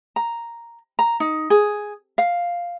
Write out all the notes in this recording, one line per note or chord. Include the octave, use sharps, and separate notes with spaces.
A#5
A#5
D#4
G#4
F5